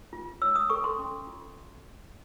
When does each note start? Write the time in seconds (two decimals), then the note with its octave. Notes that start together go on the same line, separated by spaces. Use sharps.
0.13 F4
0.42 C#5 E6
0.56 D#6
0.70 A4 C#6
0.84 C6
0.99 C#4
1.27 F4